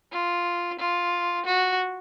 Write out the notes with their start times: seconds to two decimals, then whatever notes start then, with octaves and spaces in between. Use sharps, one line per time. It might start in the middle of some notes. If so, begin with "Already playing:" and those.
0.12 F4
0.79 F4
1.46 F#4